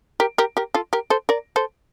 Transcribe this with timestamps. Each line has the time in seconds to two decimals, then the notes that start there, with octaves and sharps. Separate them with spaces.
0.20 G4 A#4
0.38 G4 A#4
0.57 G4 A#4
0.74 F4 A4
0.93 G4 A#4
1.10 A4 C5
1.29 A#4 D5
1.56 A4 C5